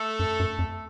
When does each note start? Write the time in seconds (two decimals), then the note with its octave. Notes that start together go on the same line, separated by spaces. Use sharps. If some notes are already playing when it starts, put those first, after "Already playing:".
Already playing: A3 A4
0.20 F#2
0.40 F#2
0.59 F2